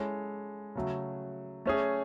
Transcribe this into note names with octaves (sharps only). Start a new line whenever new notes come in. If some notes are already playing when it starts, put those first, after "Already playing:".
Already playing: G#3 C#4 E4 A4 C#5
C#3 F#3 A3
A3 C#4 G#4